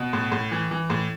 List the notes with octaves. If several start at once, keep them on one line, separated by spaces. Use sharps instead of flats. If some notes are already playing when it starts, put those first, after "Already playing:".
Already playing: B2
A2
A2
E3
E3
A2